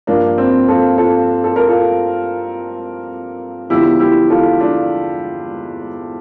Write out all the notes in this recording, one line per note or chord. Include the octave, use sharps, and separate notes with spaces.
G2 F3 A#3 D4
C4
F4 A4
F4 A4
A4
A#4
F4 A4
E2 D3 F3 E4 G4
E4 G4
F4 A4
D4 F4